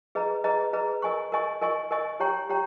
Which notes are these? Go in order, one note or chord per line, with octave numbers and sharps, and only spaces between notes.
G#4 B4 D#5 A#5
G#4 B4 D#5 A#5
G#4 B4 D#5 A#5
A#4 D#5 G#5 C#6
A#4 D#5 G#5 C#6
A#4 D#5 G#5 C#6
A#4 D#5 G#5 C#6
G4 C#5 G5 A#5 C#6
G4 C#5 G5 A#5